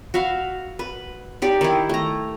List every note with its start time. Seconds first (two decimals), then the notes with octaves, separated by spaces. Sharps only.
0.14 F#4 E5 F5 B5
0.79 B4
1.42 D#4 G4 D5
1.61 D#3 E4
1.89 A3 A#5